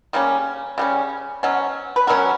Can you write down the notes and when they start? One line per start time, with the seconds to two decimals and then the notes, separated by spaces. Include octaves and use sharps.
0.13 C#3 G3 A#3 C#4
0.78 C#3 G3 C#4
1.43 B2 F#3 C#4
1.96 B4
2.07 B2 F#3 C#4 A#4